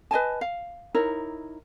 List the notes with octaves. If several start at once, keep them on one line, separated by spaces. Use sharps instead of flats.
B4 D#5 G#5 A5
F5
D#4 E4 A#4 C#5